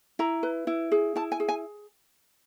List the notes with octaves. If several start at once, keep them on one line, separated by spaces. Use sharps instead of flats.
E4 A#5
B4
E4
G#4
E4 A5
G#5
G#4
G#5